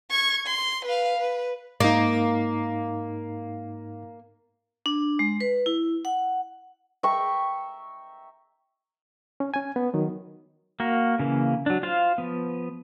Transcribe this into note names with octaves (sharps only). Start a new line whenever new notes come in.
C#6 G#6
C6
B4 F5
B4
G#2 A#3 D#4
D4
G#3
B4
E4
F#5
E5 G5 A#5 C#6
C#4
C#4 G#5
B3
D#3 F#3
A#3 F#4 A#4
C#3 E3 A#3
F#3 D4
F4 C5 F5
F3 B3